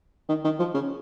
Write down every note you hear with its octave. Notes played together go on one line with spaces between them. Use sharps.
D#3
D#3
F3
C#3